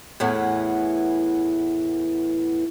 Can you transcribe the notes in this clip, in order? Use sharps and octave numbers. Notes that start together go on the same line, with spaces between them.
E2 A2 E3 B3